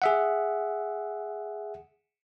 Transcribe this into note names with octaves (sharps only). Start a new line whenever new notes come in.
G#4 E5 F#5